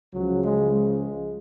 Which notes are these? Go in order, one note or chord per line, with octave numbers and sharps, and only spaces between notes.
C#2 C#3 F3 F#3
G#3
G#3